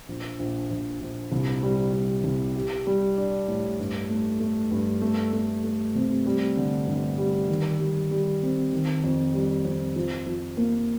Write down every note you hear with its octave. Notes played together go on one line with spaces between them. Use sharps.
A#1
A#1
A#1
A#1
C2
G3
G3
C2
G4
G3
D4
A2
G2
A3
A3
G2
A3
A3
A3
C3
G3
D3
G1
G3
D#3
G3
G3
C4
D#3
F2
G3
F2
F3
F3
A#3